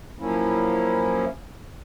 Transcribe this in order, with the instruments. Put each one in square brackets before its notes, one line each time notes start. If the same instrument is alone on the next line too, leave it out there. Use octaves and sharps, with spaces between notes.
[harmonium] F3 F#3 A#3 C#4 E4